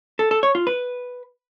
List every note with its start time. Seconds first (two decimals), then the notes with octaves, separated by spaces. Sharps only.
0.19 A4
0.31 A4
0.43 C#5
0.55 F4
0.67 B4